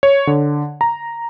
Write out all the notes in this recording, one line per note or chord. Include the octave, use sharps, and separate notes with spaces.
C#5
D3
A#5